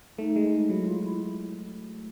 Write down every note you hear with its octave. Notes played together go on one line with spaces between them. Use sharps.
A3 D#4
G#3
F#3 E4
F4
E4